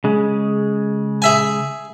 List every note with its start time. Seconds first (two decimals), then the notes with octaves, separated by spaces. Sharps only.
0.04 C#3 G#3
1.22 G#4 E5 G#5